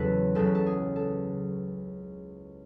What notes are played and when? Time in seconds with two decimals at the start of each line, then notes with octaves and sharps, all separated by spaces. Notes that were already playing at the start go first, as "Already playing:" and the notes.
Already playing: E2 C#3 F#3 A4 B4 C#5
0.35 C#2 C#3 F#3 A4
0.45 B4
0.55 A4
0.66 G#4
0.96 A4